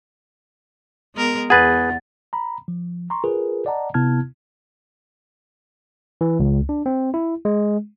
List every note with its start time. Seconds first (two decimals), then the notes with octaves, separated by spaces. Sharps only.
1.15 G#3 B3 A#4
1.50 E2 G#4 B4 F#5 A6
2.33 A#5 B5
2.68 F3
3.10 A#5 C6 C#6
3.24 F4 G#4 A#4 B4
3.66 D5 D#5 F#5 A5 A#5
3.94 C3 B3 E4 A5 F6 G#6
6.21 E3
6.40 C#2
6.69 D4
6.86 C4
7.14 E4
7.45 G#3